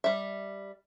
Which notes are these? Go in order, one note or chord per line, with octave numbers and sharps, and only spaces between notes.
G3 E5